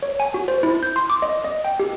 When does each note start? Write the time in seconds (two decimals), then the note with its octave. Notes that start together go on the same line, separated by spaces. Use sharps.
0.03 C#5
0.20 G#5
0.34 F#4
0.48 C5
0.63 E4
0.83 G6
0.96 C6
1.10 D6
1.22 D#5
1.44 D#5
1.64 G5
1.80 G4